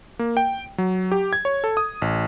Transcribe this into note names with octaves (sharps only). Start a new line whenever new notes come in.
A#3
G5
F#3
G4
G#6
C#5
A4
D#6
A1